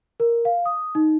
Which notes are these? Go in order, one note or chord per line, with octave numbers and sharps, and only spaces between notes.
A#4
F5
D#6
D#4